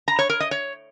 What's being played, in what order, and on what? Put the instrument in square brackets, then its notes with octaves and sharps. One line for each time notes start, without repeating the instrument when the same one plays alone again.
[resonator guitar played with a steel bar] A#5
C#5
A#4
D#5
C#5